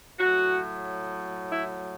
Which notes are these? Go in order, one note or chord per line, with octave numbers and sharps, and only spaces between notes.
A2 F#3 F#4
E4